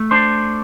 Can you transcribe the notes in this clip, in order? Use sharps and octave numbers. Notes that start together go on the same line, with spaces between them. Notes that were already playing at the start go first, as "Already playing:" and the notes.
Already playing: A3
D4 C5